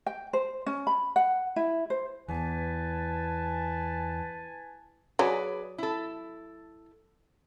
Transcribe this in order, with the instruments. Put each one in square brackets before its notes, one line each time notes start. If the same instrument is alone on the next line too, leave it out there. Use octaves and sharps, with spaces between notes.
[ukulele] G5
C5
C#4
B5
F#5
E4
C5
[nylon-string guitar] E2 [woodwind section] B4 G#5 A5
[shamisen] F#3 [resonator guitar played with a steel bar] G#4 B4 D5
[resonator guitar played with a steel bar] E4 A4